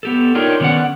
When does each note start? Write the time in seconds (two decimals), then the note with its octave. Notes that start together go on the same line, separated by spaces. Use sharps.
0.03 B3 G4 A4
0.35 D4 D#4 F4 G4 A#4 C#5
0.60 D3 D#3 B3 C#4 D5 F#5